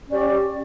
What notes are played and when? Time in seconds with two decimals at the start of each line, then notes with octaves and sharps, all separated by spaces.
0.07 C#4
0.10 D5
0.12 G4